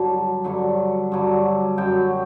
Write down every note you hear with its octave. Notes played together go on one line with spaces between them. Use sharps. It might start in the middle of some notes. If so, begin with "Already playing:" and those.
Already playing: G2 D3 F#3 A5
G2 D3 F#3
G2 D3 F#3
F#2 F#3 G5